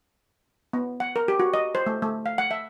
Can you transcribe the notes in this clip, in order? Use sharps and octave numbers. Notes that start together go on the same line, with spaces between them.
B3
F#5
A#4
G4
F#4
D#5
C5
A3
A3
F5
F#5
E5